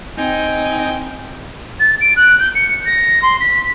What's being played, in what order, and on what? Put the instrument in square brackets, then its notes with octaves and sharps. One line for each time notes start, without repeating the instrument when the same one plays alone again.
[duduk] C4 [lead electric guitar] D#4 [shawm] G5 [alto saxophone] G#5
[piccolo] A6
D7
F#6
G6
C#7
A#6
C6
B6